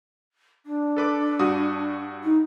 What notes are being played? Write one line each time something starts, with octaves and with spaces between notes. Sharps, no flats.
D4
A4 B4 D6
G2 F#4 D#6
D#4